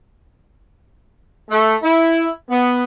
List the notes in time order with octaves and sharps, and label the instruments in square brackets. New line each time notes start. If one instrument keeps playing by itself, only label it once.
[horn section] A3
E4
B3